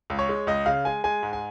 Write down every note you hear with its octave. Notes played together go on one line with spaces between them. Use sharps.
C#2
C#5
G#3
C#2 D#5
C#3 F5
G#3 G#5
G#3 G#5
G#2
G#5